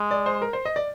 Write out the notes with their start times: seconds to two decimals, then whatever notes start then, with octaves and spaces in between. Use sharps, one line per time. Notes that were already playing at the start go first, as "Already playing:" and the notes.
Already playing: G#3
0.11 D5
0.26 C5
0.42 A#4
0.53 C5
0.65 D#5
0.76 D5